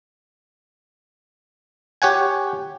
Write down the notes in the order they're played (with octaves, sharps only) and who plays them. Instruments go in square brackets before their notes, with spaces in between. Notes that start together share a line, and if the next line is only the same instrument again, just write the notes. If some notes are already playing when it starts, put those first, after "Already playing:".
[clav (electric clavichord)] G4 C#5 F#5 G#5